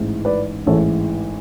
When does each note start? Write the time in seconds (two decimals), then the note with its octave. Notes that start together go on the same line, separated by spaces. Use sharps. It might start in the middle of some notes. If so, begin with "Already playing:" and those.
Already playing: A1 G#2 E3
0.25 B4 D5
0.67 A1 G#2 E3 A4 C#5